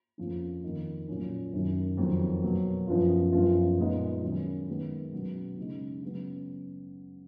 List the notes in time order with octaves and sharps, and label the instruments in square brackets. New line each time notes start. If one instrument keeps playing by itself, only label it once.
[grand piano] F2 F3 A#3 C#4
F2 D#3 A#3 D#4
A#2 F#3 C#4 F4
F#2 D#3 F#3
F2 D#3 F#3
B2 F#3 A#3
F#2 F3 B3 F4
F#2 F3 B3 F4
A#2 G#3 B3 D#4
D#3 F#3 C#4
D#3 G#3 B3
B2 F#3 C#4
C#3 G#3 D#4
C#3 F#3 B3